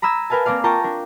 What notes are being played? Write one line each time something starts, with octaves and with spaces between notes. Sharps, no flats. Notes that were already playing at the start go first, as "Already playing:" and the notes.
A#5 B5 D#6 E6 G#6
A#4 B4 F5 G#5 A5
A#3 C4 A#4 D5 F5
F4 A#4 G5 A5 A#5 C#6
D4 A#4